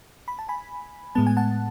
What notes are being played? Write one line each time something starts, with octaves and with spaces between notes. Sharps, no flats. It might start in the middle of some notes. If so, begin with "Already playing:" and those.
B5
A5
G#5 B5
A2 G#3 B3 A5
G#5
F#5 A5